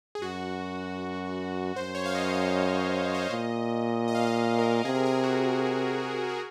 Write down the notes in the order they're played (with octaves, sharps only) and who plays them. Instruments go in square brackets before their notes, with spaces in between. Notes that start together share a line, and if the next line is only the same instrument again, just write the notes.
[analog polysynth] G#4
[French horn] F#2 [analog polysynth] F#4
[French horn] F#2 [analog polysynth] C5
[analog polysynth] C#5
F5
D#5
F5
C5
C#5
[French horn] A#2 [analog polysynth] D#5
[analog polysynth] D#5
F5
D#5
A#4
[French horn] C3 [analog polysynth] G#4
[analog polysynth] A#4
G#4
F#4
F#4